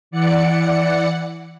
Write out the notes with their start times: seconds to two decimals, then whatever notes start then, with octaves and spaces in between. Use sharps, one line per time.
0.11 E3 D5 F#5 C#7